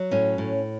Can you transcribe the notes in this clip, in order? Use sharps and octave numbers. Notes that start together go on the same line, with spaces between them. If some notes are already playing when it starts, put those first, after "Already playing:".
Already playing: F#3
A2 C#4
A2